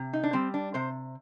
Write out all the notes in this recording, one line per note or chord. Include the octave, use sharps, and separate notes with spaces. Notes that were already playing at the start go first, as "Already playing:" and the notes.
Already playing: C3
D#4
D4
G3 C4
D4
C3 C5